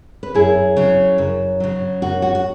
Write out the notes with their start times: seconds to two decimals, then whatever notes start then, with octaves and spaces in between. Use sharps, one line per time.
0.23 B4
0.35 F#2 E4 G#4
0.76 C#3 F#3
1.18 F#2
1.60 C#3 F#3
2.02 F#2 F#4
2.22 F#4
2.35 F#4